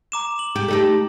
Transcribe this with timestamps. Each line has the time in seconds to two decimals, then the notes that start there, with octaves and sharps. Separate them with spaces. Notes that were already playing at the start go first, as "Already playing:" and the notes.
0.12 A#5 D6 E7
0.39 F#7
0.56 G4
0.68 A3 D#4 G4